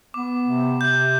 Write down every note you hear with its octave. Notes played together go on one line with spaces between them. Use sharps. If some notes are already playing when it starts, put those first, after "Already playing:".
B3 D6
C3
C3 G6